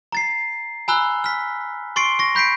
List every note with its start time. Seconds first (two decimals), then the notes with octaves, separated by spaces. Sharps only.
0.12 A#5 A6 C7
0.88 G#5 A#5 B5 E6 F#6 G7
1.24 F6 B6
1.96 C6 C#6 A6 C7 D7 G7
2.19 C#6 A#6
2.35 B5 G6 B6 C7 D7